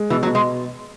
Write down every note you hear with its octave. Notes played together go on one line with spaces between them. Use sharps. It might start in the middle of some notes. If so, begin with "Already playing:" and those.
Already playing: G#3
B2 E3
F#3
B2
G#3